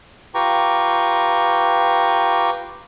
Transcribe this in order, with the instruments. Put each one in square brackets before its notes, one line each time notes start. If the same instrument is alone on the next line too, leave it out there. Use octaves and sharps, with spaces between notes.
[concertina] F4 G4 B4 G5 A#5 C#6